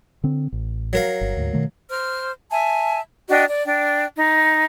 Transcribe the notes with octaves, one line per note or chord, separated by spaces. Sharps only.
D3 C4
A1
F#3 A#4 F5
G1
D2 G#2
B2 D#3 A3
C5 F6
E5 G#5 A5
D4 F#4 D#5 G5
D5
D4 G5
D#4